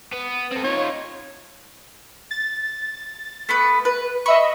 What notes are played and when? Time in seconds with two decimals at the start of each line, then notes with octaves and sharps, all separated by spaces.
0.12 B3
0.52 C4 A4
0.64 D#4 F4 C#5
2.31 A6
3.49 A3 B3 B4
3.85 B4
4.26 D#5 E5 B5 C#6